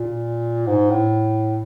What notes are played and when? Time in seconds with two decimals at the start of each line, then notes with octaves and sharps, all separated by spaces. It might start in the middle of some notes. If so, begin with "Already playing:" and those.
Already playing: A#2
0.67 G#2
0.90 A2